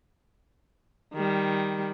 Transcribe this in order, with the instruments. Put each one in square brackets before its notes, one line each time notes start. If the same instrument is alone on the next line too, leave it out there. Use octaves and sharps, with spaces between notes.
[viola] D#3 G3